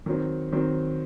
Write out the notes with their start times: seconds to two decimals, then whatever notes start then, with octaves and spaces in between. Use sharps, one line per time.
0.06 D#3 F#3 C4
0.52 D#3 F#3 C4